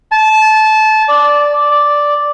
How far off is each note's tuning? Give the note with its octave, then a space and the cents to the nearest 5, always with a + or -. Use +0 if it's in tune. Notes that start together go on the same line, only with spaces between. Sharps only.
A5 -20
D5 -5
D5 -5